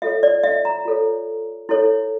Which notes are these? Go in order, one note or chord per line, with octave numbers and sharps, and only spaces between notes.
F4 A4 C#5 E5
D5
E5
A#5
F4 A4 C#5
E4 A4 C#5